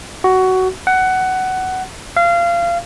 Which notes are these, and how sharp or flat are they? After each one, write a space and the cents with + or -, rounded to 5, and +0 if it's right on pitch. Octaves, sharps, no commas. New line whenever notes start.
F#4 +15
F#5 +15
F5 -25